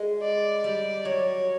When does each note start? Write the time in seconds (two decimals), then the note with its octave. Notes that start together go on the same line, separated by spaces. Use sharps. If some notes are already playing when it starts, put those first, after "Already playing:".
Already playing: G#3
0.23 D5
0.64 G3
1.05 F#3 C#5